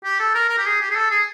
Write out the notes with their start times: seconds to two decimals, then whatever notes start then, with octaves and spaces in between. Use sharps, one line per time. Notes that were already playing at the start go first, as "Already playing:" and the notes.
0.04 G4
0.19 A4
0.34 A#4
0.49 A#4
0.58 G4
0.65 G#4
0.80 G4
0.90 G#4
0.96 A4
1.11 G#4